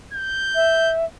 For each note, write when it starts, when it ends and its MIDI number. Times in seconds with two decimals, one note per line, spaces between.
0.13 0.94 91
0.55 1.05 76